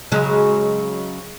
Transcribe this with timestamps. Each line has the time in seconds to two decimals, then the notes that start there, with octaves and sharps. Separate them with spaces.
0.12 C#3 F#3 G#3